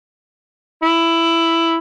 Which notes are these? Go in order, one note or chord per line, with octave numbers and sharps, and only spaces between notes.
E4